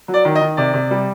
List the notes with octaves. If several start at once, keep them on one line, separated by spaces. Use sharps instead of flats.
F#3
D5
D#3
D#5
D#3
C3 D5
C3
G3